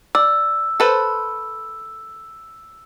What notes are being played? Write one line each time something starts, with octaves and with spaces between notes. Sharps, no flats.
D5 E6
A4 B4 C5